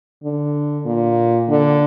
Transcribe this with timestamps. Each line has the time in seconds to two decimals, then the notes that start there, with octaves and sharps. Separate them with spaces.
0.24 D3
0.85 A#2
1.49 D3